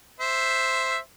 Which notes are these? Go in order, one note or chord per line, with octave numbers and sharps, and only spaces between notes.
C5 E5